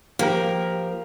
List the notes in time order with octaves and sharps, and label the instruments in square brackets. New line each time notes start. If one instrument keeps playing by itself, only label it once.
[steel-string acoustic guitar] F3 [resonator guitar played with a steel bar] A#3 G4 A#4